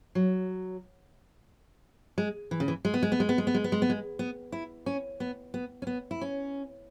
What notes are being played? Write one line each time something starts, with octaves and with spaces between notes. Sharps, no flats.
F#3
G#3
E3
C#3
E3
G#3
B3
G#3
B3
G#3
B3
G#3
B3
G#3
B3
G#3
B3
G#3
B3
E4
C#4
B3
B3
C#4
B3
E4
C#4